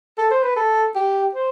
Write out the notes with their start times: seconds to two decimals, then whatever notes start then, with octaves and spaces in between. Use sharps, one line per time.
0.18 A4
0.31 C5
0.43 B4
0.56 A4
0.95 G4
1.35 C5